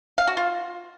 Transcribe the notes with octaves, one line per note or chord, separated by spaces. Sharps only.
F5
F#4
F4